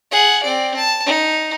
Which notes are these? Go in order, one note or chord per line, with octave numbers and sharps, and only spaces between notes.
G#4 F#5
C4 D5
A5
D#4